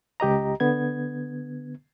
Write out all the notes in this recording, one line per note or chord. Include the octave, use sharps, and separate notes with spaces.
C#2 G4 D#5 A#5
D3 B3 G#6